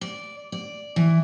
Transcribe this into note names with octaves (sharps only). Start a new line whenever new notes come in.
D5
D5
E3